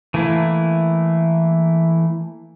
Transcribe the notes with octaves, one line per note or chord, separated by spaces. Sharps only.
E3 A3 A#3 E4